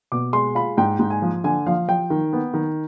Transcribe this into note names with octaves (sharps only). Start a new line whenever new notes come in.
B2 D6
G#3 C6
F4 B5
G#2 G5
G#2
G#5
F3
D3 G#5
F3 F5
F3 G5
D#3
B3
D#3